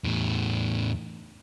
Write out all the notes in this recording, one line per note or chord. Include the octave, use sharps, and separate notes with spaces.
E2 A2